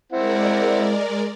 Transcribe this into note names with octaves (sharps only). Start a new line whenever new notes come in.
G#3 C4 E4 A#4 D5 F#5